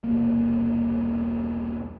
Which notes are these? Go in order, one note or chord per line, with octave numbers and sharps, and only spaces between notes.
E1 C2 C3 A#3